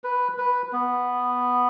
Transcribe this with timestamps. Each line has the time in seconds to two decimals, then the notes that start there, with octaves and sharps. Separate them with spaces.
0.04 B4
0.38 B4
0.73 B3